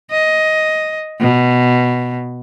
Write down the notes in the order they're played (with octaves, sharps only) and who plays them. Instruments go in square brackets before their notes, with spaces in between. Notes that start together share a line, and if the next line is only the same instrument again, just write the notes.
[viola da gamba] D#5
B2